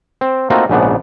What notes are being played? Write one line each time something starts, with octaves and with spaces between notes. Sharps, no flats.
C4
A3 A#3 C4 D#4 F4 F#4
A#1 G#2 C#3 B3 D4 F#5